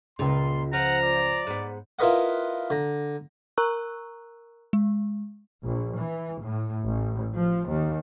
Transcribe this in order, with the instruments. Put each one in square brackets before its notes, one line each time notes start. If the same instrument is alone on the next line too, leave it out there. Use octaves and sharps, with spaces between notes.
[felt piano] C#2 C#3 [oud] A#2 [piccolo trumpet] C6
[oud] F3 [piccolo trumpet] F#5 [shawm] A#5
[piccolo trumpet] D5
[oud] G#2 B3
[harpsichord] E4 F4 A#4 B4 D#5 F#5
D3 A#5
[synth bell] A#4 A#5 C#6 E6 F#6
G#3
[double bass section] A#1
E3
A2
A1
F3
D#2